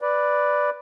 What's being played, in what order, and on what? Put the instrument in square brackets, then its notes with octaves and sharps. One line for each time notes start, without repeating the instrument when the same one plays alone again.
[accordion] B4 D5